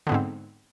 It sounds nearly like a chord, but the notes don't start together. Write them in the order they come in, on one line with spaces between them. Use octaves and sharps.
D3 B3 G#2 C4